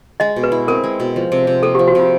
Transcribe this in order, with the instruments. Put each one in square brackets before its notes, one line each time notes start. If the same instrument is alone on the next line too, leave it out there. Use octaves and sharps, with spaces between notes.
[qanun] G#3 [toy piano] D#5
[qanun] B2
[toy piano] B4
[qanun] E4
[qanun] C4 [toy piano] A#4
[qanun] G#3
B2
F3
C3
C3
[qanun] A#3 [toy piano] A4
[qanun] F3 [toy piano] G4
[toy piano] F#4
[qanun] C3 [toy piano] F4